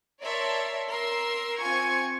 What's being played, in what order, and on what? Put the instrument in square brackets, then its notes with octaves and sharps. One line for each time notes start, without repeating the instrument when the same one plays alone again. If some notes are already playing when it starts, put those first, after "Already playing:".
[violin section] A#4 C#5 D5 E5 A5 C6
A#4 C6 E6
C4 F4 G#5 C#6 G#6